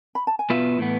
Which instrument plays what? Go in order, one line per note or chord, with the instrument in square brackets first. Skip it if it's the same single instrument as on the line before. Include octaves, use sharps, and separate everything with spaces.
[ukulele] B5
A5
G#5
[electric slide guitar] B2 B3 F4 B4 E5 [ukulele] F5
[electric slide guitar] A2 E3 B3